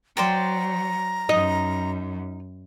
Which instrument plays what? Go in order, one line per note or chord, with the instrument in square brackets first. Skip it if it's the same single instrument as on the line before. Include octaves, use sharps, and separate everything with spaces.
[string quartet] F#3 [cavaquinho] C5 D5 G5 [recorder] A#5
[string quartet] F#2 [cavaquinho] D#4 [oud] D#5